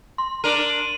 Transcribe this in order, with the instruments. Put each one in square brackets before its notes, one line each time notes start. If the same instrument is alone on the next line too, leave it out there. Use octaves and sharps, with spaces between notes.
[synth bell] C6
[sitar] D4 A#4 [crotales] D#7 F#7